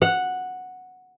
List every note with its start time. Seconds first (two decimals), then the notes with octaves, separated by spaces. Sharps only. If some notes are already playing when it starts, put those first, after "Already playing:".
0.02 F#5